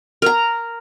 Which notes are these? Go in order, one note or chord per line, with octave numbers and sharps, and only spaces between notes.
A#4 A#5